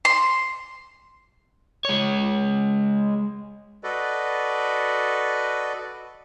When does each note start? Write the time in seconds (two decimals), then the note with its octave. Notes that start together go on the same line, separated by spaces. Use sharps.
0.05 C6
1.85 G#3 C#5
3.84 F#4 A4 B4 D5 D#5